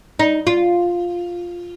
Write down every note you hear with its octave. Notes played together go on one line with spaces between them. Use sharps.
D#4
F4